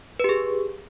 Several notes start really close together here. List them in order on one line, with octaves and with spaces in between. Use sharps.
B4 G4 G#4